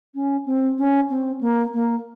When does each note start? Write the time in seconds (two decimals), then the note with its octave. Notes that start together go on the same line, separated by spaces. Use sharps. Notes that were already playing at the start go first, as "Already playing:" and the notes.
0.15 C#4
0.46 C4
0.78 C#4
1.10 C4
1.41 A#3
1.73 A#3